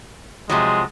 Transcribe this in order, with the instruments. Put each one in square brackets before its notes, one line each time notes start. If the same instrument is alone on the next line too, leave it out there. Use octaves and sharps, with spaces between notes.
[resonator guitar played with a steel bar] C3 F3 F#3 [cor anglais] G#3